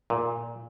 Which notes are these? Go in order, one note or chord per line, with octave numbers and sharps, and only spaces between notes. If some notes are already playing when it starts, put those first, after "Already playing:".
A#2